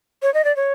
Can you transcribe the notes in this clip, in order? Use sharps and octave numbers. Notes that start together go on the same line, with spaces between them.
C#5
D#5
D5
C#5